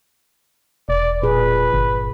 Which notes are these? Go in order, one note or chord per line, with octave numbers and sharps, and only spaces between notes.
E1 D5
A#2 G#4 B4
G1